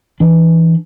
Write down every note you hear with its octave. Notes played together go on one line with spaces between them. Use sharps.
E3 D4